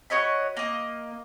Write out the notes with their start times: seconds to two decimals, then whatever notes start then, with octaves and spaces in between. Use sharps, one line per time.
0.10 F#4 C#5 D#5 B5
0.57 A#3 D#5